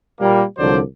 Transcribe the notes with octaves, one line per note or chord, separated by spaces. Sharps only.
A#2 G3 A#3
C2 D3 F3 F#3 C5 D5